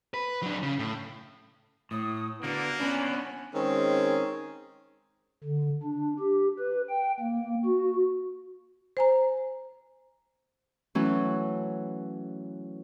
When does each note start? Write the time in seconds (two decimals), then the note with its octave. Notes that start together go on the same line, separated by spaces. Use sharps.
0.14 B4
0.43 F#3 D4
0.63 C#3
0.79 A2
1.91 A2 D#6
2.43 D3 A#3 B3 F#4
2.80 B3 C#4 D4 B5
3.54 D#3 G#3 C4 C#4 G#4
5.44 D3
5.83 D4
6.19 G4
6.59 B4
6.90 G5
7.20 A#3
7.65 F#4
8.97 C5 G#5 A#5
10.95 E3 F#3 A3 C#4